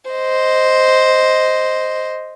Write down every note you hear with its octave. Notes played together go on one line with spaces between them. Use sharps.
C5 D#5